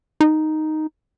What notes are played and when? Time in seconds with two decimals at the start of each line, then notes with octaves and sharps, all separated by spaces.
0.20 D#4